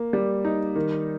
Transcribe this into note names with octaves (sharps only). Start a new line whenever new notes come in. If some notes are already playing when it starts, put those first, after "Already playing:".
Already playing: A#3
G3
D#4
D#3